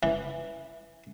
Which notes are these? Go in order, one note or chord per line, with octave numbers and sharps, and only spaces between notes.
E3